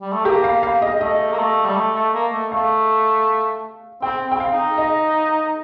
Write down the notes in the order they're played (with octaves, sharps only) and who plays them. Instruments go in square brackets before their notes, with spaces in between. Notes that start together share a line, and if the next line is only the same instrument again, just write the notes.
[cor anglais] G3
A3
[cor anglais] A#3 [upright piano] G4
[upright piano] F5
F5
D#5
[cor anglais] A3 [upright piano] D#5
[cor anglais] A#3
A3
G3
A3
A3
A#3
A3
[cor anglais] A3 [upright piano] F5
[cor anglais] C4 [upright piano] G5
[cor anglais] C4 [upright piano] G5
[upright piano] F5
[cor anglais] D#4
[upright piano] D#5